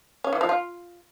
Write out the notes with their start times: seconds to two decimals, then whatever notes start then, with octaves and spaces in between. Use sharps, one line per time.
0.24 C#4
0.33 E3
0.41 F3
0.49 F4